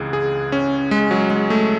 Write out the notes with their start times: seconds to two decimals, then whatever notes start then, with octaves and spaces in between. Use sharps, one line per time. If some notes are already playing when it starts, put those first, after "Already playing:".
Already playing: C#2 C3 E3 G#4
0.13 G#4
0.52 C#4
0.91 G#3
1.11 F#3
1.30 G#3
1.50 A3